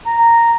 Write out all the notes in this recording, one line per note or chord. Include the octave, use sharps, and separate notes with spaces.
A#5